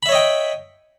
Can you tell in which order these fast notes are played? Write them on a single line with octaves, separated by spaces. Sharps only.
B5 E5 C#5 D#5 G5